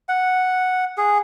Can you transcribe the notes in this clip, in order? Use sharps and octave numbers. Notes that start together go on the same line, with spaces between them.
F#5
G#4